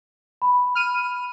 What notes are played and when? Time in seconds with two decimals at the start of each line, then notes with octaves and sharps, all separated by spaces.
0.42 B5
0.75 F6 D#7